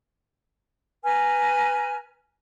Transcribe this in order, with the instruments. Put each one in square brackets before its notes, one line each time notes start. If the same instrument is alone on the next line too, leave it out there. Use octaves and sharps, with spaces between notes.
[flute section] B4 G#5 A#5 F6